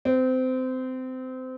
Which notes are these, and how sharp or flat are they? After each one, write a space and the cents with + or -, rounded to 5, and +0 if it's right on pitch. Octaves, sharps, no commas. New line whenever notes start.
C4 -25